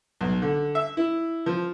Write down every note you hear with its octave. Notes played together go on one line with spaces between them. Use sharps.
B1
D3
E5
E4
F3